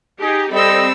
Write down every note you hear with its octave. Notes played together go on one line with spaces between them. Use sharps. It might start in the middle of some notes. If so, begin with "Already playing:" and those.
D#4 G4 G#4
G3 C4 A4 D#5 B5 E6